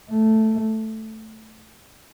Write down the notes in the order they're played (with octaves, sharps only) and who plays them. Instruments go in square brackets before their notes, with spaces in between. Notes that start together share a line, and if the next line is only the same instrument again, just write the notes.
[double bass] A3